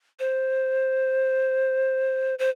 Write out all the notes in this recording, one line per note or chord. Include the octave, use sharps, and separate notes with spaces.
C5
C5